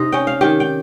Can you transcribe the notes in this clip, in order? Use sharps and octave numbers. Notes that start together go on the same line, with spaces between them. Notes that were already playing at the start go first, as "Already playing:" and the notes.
Already playing: C3 D#4 D#5
C#4 G5
F5
D#3 G4 G5
G5